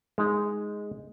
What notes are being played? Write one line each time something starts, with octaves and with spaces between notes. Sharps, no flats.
G#3 D#4